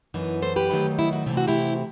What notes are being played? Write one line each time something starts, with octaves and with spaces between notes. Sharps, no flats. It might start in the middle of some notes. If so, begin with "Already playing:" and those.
F#2 E3 B3 D#4
A4 C5
G4 B4
D#3 F#3 A3 D#4
E4
F#4
C3 E3 A3 C4 G4
F#4
E4 G4